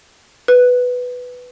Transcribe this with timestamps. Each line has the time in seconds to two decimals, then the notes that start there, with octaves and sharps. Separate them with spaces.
0.48 B4